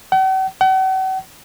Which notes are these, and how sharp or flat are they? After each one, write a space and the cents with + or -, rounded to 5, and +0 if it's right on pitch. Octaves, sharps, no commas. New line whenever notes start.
F#5 +45
F#5 +40